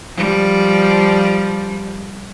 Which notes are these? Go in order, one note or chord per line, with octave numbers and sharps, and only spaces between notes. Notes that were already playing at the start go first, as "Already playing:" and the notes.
F3 G3